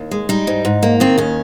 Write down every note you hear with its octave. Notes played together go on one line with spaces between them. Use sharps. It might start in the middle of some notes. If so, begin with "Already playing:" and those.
Already playing: D#2
G#3
G3 D#4
G#2
G#2
A#3
D#3 C4
D#2 C#4